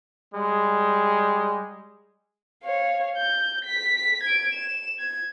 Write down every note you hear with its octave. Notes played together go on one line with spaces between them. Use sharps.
G3 G#3
C#5 F5
G6
B6
G#6 D7
E7
G#6